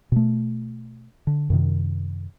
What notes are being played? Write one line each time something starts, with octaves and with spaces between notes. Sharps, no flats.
B2 A3
D3
F#2 C3 D#3